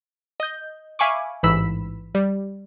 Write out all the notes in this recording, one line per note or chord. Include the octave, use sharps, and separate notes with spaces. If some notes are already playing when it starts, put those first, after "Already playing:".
D#5 G6
E5 F5 G#5 B5 C#6 D6
A1 G#2 E3 B5 E6 B6
G3